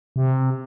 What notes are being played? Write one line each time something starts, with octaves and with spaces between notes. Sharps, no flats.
C3